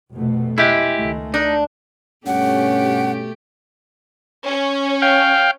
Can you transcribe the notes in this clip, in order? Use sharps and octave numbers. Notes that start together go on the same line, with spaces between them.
F1 B2 A3
G#3 E4 G4
C#2 D#3 A3
D4 D#4
G2 B2 A3 C#4 G4 F#5
C#4
F5 G5